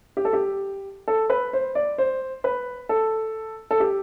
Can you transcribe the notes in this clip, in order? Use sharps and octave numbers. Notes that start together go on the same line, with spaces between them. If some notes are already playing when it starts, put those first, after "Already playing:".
G4
A4
G4
A4
B4
C5
D5
C5
B4
A4
A4
G4